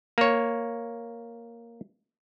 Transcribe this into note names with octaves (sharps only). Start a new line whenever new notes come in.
A#3 C#5